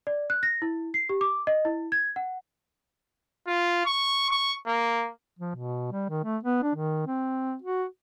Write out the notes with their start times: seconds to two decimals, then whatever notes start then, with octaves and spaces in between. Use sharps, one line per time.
0.07 D5
0.30 F#6
0.43 A#6
0.62 E4
0.94 C7
1.09 G4
1.21 D6
1.47 D#5
1.65 E4
1.92 G#6
2.16 F#5
3.47 F4
3.86 C#6
4.31 C#6
4.67 A#3
5.39 F3
5.55 B2
5.92 G3
6.09 D#3
6.24 A3
6.43 B3
6.63 D4
6.75 D#3
7.07 C4
7.62 F#4